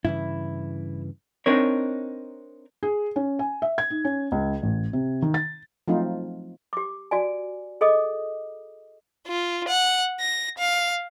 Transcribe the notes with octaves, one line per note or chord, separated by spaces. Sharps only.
G2 C#3 E3 E4
C4 D4 D#4 A#4 C#5
G#4
C#4
G#5
E5
G#6
D#4
C#4
C#2
A1
C3
D#3
A6
F3 F#3 A3 C4 D#4 F4
G4 D6
F#4 D5 G#5
G#4 A4 D#5 D6 D#6
F4
F#5
A#6
F5